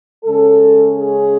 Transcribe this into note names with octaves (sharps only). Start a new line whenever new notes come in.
C#3 G#3 C#4 A4
G#4